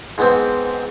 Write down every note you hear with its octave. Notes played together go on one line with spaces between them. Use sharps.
G#2 B3 C4